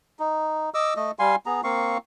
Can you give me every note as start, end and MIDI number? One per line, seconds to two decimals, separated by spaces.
0.19 0.70 63
0.74 0.94 75
0.74 0.94 86
0.74 0.94 88
0.96 1.11 57
0.96 1.11 75
1.19 1.36 55
1.19 1.36 77
1.19 1.36 80
1.19 1.36 84
1.46 1.61 59
1.46 1.61 68
1.46 1.61 82
1.64 1.98 58
1.64 1.98 60
1.64 1.98 77
1.64 1.98 85